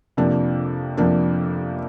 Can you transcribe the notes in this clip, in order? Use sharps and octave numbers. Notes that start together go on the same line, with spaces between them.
F2 C3 F3 A#3 D4
F2 C3 F3 A#3 D4